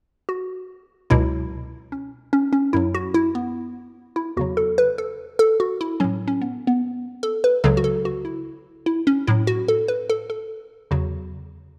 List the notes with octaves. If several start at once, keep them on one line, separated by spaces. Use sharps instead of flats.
F#4
C#2 B2 F#3 E4
C#4
C#4
C#4
F#2 F#3 E4
F#4
E4
B3
E4
E2 C#3 F#3 F#4
A4
B4
A4
A4
F#4
E4
A2 F#3 C#4
C#4
B3
B3
A4
B4
C#2 C#3 F#3 A4
F#4
A4
F#4
E4
E4
C#4
A2 F#3 E4
F#4
A4
B4
A4
A4
E2 C#3 F#3 F#4